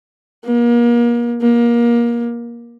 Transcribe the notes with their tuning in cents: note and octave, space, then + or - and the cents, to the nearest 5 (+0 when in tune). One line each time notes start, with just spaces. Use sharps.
A#3 +35
A#3 +25